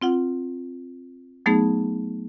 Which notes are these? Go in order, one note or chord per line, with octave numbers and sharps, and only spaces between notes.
C4 F4 F#5
F#3 A3 B3 D#4 G#4